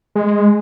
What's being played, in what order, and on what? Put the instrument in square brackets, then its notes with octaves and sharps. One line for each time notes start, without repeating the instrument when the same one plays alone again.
[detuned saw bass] G#3